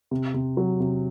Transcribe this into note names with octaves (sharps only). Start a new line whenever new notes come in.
C3
C3
F#3
C3